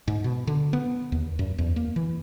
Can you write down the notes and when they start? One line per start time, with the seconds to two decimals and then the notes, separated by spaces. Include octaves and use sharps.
0.08 G#2
0.24 B2
0.47 D3
0.73 B3
1.12 D#2
1.39 F#2
1.58 E2
1.76 A#3
1.96 E3